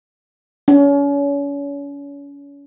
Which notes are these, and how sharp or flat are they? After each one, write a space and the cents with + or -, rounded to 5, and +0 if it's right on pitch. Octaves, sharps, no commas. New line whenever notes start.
C#4 +35